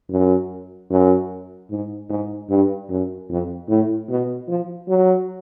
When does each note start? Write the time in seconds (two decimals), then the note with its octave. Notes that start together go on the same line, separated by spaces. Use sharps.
0.10 F#2
0.91 F#2
1.71 G#2
2.10 G#2
2.50 G2
2.90 F#2
3.29 F2
3.68 A2
4.09 B2
4.48 F3
4.88 F#3